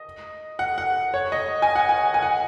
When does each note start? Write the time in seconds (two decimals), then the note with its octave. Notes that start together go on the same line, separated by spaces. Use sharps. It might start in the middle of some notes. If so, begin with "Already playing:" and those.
Already playing: D#5
0.59 F#5
0.78 F#5
1.14 C#5
1.32 D#5
1.62 G#5
1.75 F#5
1.89 G#5
2.14 G#5
2.22 F#5